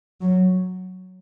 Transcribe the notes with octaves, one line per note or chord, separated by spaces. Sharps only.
F#3